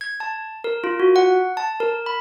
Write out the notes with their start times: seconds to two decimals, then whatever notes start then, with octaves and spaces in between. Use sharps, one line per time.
0.01 G#6
0.20 A5
0.64 A#4
0.84 F4
1.00 F#4
1.16 F#5
1.57 A5
1.80 A#4
2.06 B5